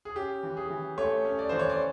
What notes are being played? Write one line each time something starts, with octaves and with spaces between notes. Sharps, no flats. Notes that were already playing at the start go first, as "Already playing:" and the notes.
G#4
C#4 G4
E3
G#4
E3
A3 C#5
C#4
D5
E3 C5
C#5
D5